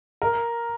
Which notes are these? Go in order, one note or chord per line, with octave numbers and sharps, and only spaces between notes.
A#4